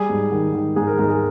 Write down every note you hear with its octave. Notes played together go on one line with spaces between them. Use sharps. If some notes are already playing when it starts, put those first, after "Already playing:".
Already playing: G3 G#4
G#2
D#3
D#3
G#2 G#4
A#4
G#2 G#4
G#4